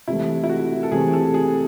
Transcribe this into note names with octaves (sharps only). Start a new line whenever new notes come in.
C3 E3 A3 E4
E4
F#4
A4
C3 E3 A3 G#4
A4
G#4